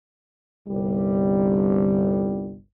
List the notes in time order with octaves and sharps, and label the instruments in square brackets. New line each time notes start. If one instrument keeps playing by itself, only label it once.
[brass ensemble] G1 C2 G3